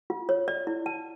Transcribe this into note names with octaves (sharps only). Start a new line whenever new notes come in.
F4
C#5
D5
E4
A5